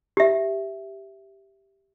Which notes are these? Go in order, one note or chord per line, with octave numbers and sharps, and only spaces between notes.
G4 E5